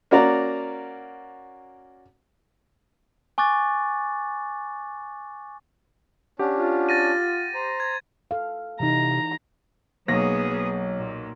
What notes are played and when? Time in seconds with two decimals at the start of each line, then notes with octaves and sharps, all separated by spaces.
0.11 A#3 C#4 F#4 D5 A#5
3.38 G#5 C#6 D6 F#6 A6
6.39 C#4 D4 G4 F#5
6.55 F4
6.89 A6 A#6 D#7
7.54 C5 A#5
7.80 G#6
8.31 A4 F5
8.80 C3 E3 D#4 A#5
10.08 B1 F#3 A#3 B3 G#4 A#6
10.50 F#3
10.98 A#2